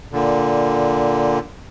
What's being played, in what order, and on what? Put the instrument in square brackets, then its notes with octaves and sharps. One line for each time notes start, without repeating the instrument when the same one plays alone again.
[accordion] A#2 D3